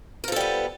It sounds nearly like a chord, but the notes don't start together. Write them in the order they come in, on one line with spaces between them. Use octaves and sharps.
A#4 F3 A4 G3 B3